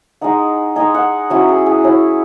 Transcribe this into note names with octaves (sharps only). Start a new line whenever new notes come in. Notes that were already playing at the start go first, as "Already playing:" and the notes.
G#3 D#4 F#5
G#3 D#4 G#5
F#5
F#3 C#4 E4 F#4
G#4
G#4
F#3 C#4 E4